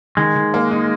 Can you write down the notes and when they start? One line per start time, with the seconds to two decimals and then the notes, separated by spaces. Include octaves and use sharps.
0.17 D#3 G#3
0.35 D#3
0.54 A#3
0.71 D#4